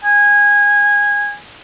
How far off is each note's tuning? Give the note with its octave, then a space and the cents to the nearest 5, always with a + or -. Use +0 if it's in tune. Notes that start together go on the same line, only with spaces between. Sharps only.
G#5 -15